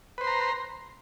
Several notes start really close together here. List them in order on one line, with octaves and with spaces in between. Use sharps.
B4 C5 C6 A#5